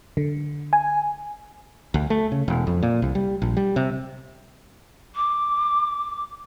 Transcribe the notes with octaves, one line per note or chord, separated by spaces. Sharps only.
D3
G#5
D2
A3
C#3
E1
F2
A#2
C2
G3
A#1
G3
C3
D6